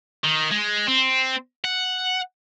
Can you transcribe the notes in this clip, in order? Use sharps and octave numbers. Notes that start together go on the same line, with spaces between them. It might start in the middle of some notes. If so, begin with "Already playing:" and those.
D#3
G#3
C4
F#5